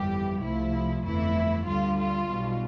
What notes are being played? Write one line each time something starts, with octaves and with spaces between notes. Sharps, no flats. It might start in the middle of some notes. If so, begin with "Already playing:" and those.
Already playing: G1 F2 E3 G3 G4
C2 C3 F3 A3 E4
G1 F2 E3 A3 E4
D2 D3 G3 F4
F4
B1 B2 G3